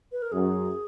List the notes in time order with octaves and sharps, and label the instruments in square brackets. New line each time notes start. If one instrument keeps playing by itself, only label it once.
[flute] B4
A#4
[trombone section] F#2 [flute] G#4